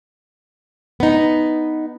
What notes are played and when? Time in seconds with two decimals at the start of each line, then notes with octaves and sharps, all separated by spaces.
1.00 B3 D#4